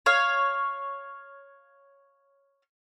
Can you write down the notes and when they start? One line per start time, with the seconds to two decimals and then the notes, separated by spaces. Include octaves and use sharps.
0.06 C#5 F5